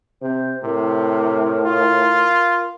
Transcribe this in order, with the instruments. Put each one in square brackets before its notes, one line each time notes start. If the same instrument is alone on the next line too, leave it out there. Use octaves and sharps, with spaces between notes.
[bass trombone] C3 [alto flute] C5
[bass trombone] A2 [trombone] C3 [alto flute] A#4
[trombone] F4